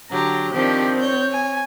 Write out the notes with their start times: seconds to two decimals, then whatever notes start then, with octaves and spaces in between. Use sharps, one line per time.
0.11 D3 F#3 G4 A#5
0.53 D#3 F3 C4 D4 G4
1.00 C#5 G6
1.32 G#5